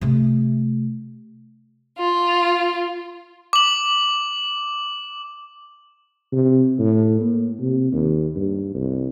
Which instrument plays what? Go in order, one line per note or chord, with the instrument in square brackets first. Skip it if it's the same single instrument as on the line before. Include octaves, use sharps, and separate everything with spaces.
[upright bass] C3 A3
[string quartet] F4
[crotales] D6 F#7
[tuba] C3
A2
A#3
C3
D#2
G2
C2